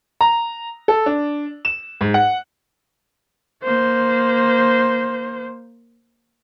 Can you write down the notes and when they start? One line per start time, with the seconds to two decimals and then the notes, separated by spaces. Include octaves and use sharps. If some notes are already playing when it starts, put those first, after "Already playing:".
0.21 A#5
0.88 A4
1.06 D4
1.65 E7
2.01 G#2
2.14 F#5
3.64 A#3 C5